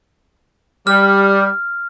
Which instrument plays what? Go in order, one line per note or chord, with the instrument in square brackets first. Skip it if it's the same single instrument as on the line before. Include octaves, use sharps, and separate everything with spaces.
[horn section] G3 [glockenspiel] F6